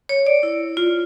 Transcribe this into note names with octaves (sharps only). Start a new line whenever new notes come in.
C#5
D5
E4
F4